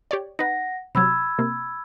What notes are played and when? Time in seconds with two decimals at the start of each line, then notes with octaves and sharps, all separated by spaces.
0.11 G4 C#5 D5
0.39 D#4 B4 F#5 A#6
0.95 C3 F#3 B5 E6 G#6
1.39 C3 A#3